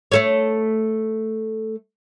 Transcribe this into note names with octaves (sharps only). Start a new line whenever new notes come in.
A3 A4 C#5